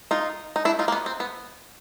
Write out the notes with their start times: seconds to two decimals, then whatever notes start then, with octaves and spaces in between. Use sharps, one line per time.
0.11 D#4 F4
0.56 D#4
0.65 D4 E4
0.79 D#4 F4
0.88 A#3
0.92 B3
1.06 C4
1.20 B3